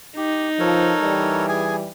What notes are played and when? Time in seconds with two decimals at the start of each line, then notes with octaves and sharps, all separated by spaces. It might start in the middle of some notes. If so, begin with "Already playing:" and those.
0.17 D#4 G4
0.59 F3 A4 A#4 C#5
1.02 E3 G3
1.49 G#4 G#5